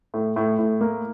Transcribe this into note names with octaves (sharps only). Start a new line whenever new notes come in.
A2
A2
A2
A#3